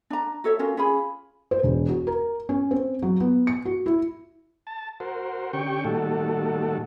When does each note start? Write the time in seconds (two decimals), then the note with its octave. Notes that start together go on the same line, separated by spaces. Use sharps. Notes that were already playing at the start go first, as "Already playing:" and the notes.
0.10 D4 A#5
0.44 F#4 A4 C#5 E5
0.59 C#4 F4 F#4 A#4
0.77 C#4 F4 G#4 B5
1.51 C5
1.63 E1
1.89 F#4
2.07 A#4
2.49 C#4
2.71 C4
3.02 F#3
3.20 B3
3.47 C#7
3.65 F#4
3.86 E4
4.67 A5
5.00 F#4 A#4 C5
5.53 D3 C#4 G4 G5 C#6
5.84 A#2 D#3 G3 A3 F#4 A4